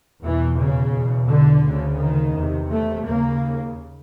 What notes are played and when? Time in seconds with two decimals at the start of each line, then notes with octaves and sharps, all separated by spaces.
0.23 E2 B2 E3
0.59 C#3
0.94 E2 B2
1.29 D3
1.65 D2 C#3
1.99 D#3
2.35 E2 C3
2.71 A3
3.06 D#2 C#3 A#3